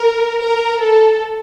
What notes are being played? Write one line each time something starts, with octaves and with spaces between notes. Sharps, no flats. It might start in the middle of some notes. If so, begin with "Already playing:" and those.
Already playing: A#4
A#4
A4